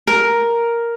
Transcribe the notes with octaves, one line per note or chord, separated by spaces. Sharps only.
A#4